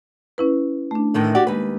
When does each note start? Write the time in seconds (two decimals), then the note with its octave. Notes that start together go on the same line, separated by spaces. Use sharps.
0.38 C#4 E4 B4
0.91 A3 D4
1.14 A2 D#3 E3
1.35 F#4 G4 D5
1.47 D#2 G#3 B4